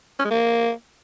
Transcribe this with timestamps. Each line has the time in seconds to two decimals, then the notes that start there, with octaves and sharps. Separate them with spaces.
0.19 C#4
0.25 G#3
0.30 A#3